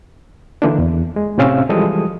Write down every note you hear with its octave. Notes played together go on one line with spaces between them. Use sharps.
D3 E3 A#3 D4
E2
G#3
A2 C3 C4 C#4 F5 E6
E3 F3 G3 G#3 A4 D#6